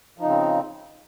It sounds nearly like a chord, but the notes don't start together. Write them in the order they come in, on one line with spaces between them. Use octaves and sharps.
F3 D#4 C#3 C4